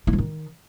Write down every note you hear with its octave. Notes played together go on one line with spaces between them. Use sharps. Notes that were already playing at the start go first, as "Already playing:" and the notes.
E4
F3
D#3